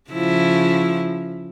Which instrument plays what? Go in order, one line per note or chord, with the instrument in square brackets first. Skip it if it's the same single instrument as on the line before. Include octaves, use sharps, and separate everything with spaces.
[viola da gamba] C#3 F3 E4